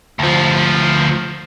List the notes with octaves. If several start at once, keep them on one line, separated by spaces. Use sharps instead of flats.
D2 F3